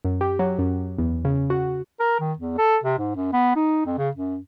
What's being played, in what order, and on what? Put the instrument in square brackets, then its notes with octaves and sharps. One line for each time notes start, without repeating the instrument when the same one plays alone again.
[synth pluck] F#2
G4
F#3
F#2
E2
C#3
F#4
[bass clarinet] A#4
D#3
E2
A4
C3
G#2
F#2
B3
D#4
F2
C#3
F#2